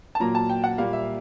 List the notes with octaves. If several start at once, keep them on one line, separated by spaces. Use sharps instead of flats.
A5
A#2 F#3 A#3 A#5
A5
G5
F#5
A#2 G3 A#3 F5
E5